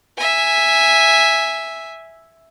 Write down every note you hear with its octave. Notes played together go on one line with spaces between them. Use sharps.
E5 G#5